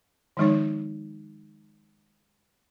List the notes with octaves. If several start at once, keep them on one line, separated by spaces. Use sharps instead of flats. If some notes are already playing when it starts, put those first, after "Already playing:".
D#3 F3 G#3 D#4 C#5